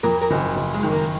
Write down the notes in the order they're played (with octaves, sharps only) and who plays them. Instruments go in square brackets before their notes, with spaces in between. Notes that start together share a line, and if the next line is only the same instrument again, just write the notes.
[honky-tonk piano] F2 [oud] A#4
[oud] A#4
[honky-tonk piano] F#1
F#1
[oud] G#3
[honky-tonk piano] D#3
[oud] A#3